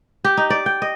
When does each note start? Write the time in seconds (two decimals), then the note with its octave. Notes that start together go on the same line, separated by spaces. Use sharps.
0.24 G4
0.37 D#4
0.50 D5
0.66 G5
0.82 D#5